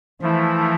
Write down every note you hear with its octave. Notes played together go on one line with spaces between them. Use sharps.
E3 F3 A3 E4